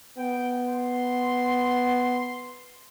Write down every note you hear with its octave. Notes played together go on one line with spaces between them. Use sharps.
B3 G5
C6